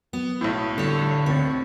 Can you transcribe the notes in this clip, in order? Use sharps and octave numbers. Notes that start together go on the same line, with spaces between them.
F#3 B3
B1 A2
D3 G3 A4 C#5
D2 C4 C#5 A6